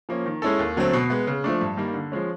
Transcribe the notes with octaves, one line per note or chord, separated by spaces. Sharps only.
F3 A#3 C#4
D#3
G#3 C#4 E4 A4
D#2
D3 F#3 A3 C4
B2
G#3 B3
C#3
F3 A3 D4
G2
D#3 G3 A#3 D#4
D3
F3 G#3 C#4